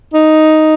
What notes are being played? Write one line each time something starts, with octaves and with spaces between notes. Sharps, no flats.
D#4